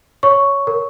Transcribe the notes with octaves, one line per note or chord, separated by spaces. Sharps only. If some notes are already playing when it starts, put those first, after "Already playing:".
C#5 C#6
A#4